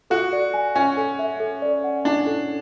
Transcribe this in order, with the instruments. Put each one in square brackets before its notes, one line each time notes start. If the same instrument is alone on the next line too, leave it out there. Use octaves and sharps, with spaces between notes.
[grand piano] F#4 [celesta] A4
[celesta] D5
G#5
[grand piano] C#4 [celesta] G#5
[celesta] A4
E5
A4
D5
F#5
[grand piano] D4 [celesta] E4
[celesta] A4